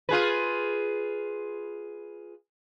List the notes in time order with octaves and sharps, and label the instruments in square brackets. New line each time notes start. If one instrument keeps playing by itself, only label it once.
[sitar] F4 G#4 B4